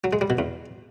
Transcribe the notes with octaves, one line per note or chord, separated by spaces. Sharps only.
F#3
G#3
G3
B2
E2